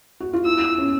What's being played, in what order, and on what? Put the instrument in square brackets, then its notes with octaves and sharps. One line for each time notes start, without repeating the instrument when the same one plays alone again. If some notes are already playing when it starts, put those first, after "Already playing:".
[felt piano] F#4
F4
[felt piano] E4 [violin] E6
[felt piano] C#4